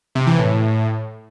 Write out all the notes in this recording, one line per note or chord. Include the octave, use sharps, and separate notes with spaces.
C3
E3
A2